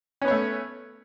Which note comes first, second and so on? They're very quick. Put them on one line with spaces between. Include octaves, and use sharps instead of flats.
C#4 B3 C#5 A3